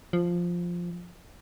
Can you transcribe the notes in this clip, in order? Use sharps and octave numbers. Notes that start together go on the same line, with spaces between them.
F3